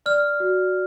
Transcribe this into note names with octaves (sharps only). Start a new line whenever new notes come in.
D5 F6
F#4